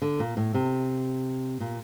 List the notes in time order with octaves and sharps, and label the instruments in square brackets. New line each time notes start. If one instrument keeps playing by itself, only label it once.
[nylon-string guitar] D3
A#2
A2
C3
A#2